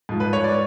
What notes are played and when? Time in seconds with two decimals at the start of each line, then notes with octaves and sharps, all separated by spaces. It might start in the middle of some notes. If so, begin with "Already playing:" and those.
0.09 G#2 F3
0.20 B4
0.33 C#5
0.44 D5